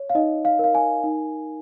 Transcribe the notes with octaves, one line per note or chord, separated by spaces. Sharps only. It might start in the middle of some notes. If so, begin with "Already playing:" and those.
Already playing: C#5
F5
D#4 D#5
F5
A#4 F5
G#5
D#4